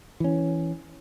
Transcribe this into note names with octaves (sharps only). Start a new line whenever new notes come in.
E3 C#4